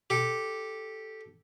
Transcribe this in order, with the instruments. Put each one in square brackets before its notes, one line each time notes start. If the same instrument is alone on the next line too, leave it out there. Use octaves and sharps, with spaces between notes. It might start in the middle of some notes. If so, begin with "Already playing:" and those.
[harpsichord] G4 A4